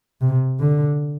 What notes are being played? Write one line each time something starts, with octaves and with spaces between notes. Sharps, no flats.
C3
D3